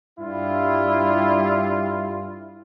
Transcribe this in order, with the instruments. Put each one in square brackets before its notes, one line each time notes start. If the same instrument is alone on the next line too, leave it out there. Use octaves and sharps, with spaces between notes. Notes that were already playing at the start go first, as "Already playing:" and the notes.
[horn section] G2 G3 E4 F4